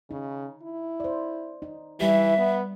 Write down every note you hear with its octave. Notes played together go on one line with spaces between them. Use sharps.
C#3 D#4
E4
C5 D5
D#4
E3 G3 G4 E5
B3